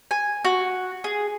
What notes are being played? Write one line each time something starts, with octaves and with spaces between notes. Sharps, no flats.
G#5
F#4
G#4